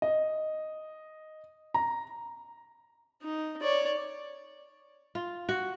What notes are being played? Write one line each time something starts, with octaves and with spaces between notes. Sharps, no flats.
D#5
A#5
D#4
C#5 D5
F4
F#4